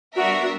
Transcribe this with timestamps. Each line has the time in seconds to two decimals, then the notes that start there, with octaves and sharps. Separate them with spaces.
0.15 G3 B3 D4 F#4 A#4 E5